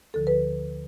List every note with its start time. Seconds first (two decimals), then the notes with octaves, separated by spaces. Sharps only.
0.14 D2 D3 F3 A4
0.27 B4